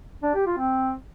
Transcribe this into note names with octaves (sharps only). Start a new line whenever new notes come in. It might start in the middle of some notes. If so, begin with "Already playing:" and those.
D4
G4
F4
C4